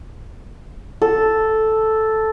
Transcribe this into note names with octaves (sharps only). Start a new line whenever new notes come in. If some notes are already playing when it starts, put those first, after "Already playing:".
A4